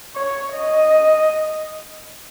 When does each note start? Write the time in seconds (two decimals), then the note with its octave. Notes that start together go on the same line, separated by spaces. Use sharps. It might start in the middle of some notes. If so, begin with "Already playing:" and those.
0.16 C#5
0.54 D#5